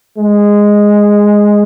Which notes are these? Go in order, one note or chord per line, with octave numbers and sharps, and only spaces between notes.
G#3